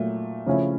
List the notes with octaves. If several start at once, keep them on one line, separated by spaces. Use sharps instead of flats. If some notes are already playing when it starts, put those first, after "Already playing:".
Already playing: A#2 F#3 A3
C#3 F3 A3 C#4 E4